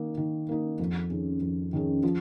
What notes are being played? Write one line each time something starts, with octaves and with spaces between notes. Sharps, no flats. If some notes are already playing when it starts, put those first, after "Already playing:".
Already playing: D#3 A#3 D#4
D#3
A#3 D#4
F2
D#3 C#4 G#4
F2
D#3 C#4 G#4
F3